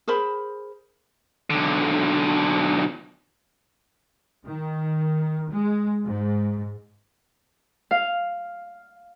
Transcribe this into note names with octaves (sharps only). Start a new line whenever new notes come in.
G#4 A#4 C5 B5
B1 D3
D#3
G#3
G#2
F5